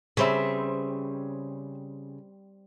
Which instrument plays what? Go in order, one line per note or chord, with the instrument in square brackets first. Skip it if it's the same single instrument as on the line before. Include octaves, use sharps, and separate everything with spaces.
[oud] C#3 [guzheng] G3 C4 [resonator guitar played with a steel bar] B4 E5